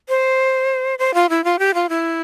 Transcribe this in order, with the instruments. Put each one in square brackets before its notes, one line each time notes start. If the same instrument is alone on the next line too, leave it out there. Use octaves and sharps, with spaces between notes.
[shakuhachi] C5
C5
F4
E4
F4
G4
F4
E4